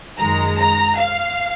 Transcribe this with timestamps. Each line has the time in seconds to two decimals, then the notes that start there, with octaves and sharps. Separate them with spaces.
0.18 F#2 D#3 G#3 A#5
0.57 A#5
0.97 F5